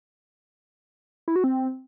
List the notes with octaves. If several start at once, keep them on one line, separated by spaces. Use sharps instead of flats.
E4
F#4
C4